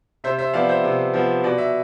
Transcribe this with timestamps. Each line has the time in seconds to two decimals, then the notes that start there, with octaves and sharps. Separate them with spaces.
0.24 C3 C5 E5
0.39 C5 E5
0.54 F3 B3 D5 F5
0.69 C5 E5
0.84 C3
1.14 F3 B3
1.43 B2 D5
1.58 E5